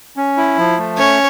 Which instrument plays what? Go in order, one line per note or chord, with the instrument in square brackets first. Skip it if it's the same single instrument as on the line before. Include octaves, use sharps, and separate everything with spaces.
[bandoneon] C#4
E4
F3
A3
[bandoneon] C#4 [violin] C#5